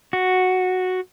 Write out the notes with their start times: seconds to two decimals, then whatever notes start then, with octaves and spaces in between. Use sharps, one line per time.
0.13 F#4